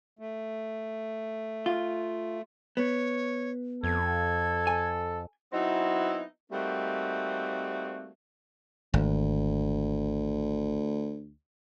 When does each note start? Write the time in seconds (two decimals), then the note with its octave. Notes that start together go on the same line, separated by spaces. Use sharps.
0.19 A3
1.66 F4
2.77 B3 C#5
3.84 F2 A4 G#6
4.67 G#5
5.53 F#3 B3 C4 D#4 E4
6.51 G3 A3 A#3 C4 D#4 F#4
8.94 G#1 D2